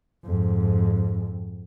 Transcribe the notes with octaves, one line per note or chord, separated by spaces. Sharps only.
F2 G#2